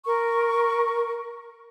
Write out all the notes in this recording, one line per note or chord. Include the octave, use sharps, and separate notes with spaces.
A#4 C#6